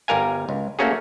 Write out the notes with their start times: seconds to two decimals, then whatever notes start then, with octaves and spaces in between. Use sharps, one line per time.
0.08 G1 G3 A#4 F5 G#5
0.49 C#2
0.79 A3 A#3 C#4 F#4 G#4